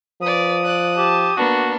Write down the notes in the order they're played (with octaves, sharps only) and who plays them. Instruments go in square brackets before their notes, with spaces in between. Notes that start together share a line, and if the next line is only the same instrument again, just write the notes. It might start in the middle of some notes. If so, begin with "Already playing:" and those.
[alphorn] F3 [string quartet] B4 D5 [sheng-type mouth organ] D#6
[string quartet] D5 F#6
[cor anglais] G4 [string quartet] A5
[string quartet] A#3 B3 D4 [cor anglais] F#4